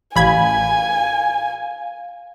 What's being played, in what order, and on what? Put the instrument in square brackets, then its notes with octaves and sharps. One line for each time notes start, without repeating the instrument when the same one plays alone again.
[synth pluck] A1 B5 G#6 [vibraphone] F5 [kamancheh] G#5